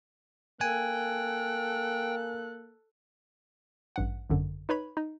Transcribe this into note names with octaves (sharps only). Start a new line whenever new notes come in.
A#3 A4 G5 G#5 F#6
A1 G2 F#5
G#1 F#2 D3
D#4 B4 C#5 B5
D#4